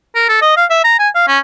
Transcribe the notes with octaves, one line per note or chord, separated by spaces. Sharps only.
A#4
A4
D#5
F5
E5
A#5
G#5
F5
C#4